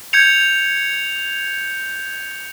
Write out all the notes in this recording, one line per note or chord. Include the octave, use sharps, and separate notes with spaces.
G6 G#6 C#7 F7